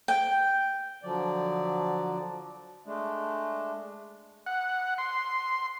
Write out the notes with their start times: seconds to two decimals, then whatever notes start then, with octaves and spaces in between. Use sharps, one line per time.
0.08 G5
1.03 D3 F3 F#3 D5
2.85 G#3 A3 D4
4.46 F#5
4.98 C6